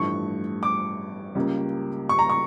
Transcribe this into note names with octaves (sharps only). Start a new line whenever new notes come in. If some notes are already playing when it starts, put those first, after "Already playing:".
Already playing: A1 G2 F3 A3 C#6
D6
C#2 C#3 G3 A#3
C#6
A#5
C#6